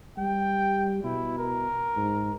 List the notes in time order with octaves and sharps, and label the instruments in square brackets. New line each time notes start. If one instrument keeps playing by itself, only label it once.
[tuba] G3 [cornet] G5
[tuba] B2 [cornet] E4
[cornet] A#4
[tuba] G#2